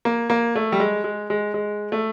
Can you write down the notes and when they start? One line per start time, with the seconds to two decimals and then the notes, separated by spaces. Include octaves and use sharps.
0.05 A#3
0.30 A#3
0.55 A3
0.72 G3
0.80 G#3
1.04 G#3
1.30 G#3
1.54 G#3
1.92 A3